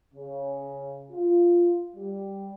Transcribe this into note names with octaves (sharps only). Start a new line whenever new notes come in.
C#3
F4
G3